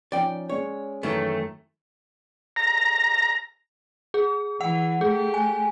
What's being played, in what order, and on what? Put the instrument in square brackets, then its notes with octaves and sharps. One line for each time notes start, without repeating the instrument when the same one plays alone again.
[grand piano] F3 C#4 D#4 [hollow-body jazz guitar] D5 G5
[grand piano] G#3 C#4 D5 [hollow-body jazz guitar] C#5
[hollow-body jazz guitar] F#2 D#3 E3 [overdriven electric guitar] A3
[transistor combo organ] A#5
[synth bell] G#4
[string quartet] E3 [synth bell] F#5
[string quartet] A3 G4 [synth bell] G#4
[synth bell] G#5